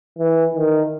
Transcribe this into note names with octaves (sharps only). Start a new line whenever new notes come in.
E3
D#3